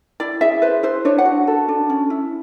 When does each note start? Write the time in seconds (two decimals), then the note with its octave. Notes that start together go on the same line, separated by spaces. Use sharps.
0.20 E4 D5
0.41 G#4 E5
0.62 B4 C5
0.83 E4 C5
1.05 D4 C#5
1.18 F#5
1.25 F#4
1.47 A4
1.69 D4
1.90 C#4
2.10 E4